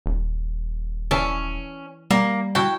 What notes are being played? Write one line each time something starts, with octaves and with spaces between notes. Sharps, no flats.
D#1
E3 C#4 E5 A5
G3 A#3
E4 F#4 G5 A5